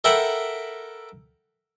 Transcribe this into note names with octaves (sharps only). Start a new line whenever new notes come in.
A4 A#4 E5 F#5 G5 B5